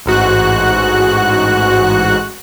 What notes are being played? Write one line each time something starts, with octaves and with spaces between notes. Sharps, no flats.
A1 G#2 F#4 F#6